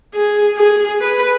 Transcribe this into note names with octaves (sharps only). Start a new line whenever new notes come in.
G#4
G#4
B4